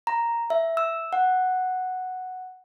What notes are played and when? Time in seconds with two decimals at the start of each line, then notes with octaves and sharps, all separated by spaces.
0.07 A#5
0.50 E5
0.77 E6
1.13 F#5